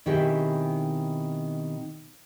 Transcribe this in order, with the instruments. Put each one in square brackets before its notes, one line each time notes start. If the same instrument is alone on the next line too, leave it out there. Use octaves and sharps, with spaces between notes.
[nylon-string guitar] B2 D#3 C4 E4 G4 G#4